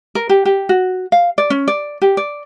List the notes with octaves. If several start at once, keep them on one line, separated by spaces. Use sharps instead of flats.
A#4
G4
G4
F#4
F5
D5
C#4
D5
G4
D5